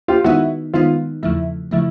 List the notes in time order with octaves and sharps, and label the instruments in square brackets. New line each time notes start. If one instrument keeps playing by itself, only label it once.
[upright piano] F4 G4
[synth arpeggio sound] D#3 G#3 B3 D#4 [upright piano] E4 F#4
[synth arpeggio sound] D#3 G#3 B3 D#4 [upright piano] F4
[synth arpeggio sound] E2 C#3 F3 A3 [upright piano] E4
[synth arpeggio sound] C#3 F3 A3 [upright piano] E4